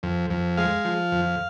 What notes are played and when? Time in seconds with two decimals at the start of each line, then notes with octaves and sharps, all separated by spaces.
0.03 F2
0.30 F2
0.57 G#3 F5
0.85 F3
1.12 F2